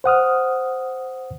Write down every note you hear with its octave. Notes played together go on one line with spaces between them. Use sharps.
C5 F#5 D#6 F6